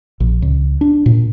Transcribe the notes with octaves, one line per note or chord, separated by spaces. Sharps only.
A#1
C#2
D4
A#2